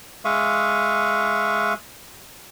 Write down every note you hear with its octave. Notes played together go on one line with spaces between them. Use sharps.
G#3 E5 F5 C#6 D#6